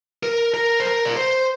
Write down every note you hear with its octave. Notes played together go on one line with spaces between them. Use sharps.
A#4
A#4
C5
A#4
D5
C5